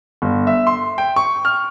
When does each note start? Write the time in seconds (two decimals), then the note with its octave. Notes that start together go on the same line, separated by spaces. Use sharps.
0.22 G1
0.47 E5
0.67 C6
0.98 G5
1.16 C#6
1.45 F6